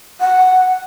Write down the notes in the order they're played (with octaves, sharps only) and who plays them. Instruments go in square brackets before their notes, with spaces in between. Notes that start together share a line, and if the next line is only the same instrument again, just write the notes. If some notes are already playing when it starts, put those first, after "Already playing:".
[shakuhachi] F#5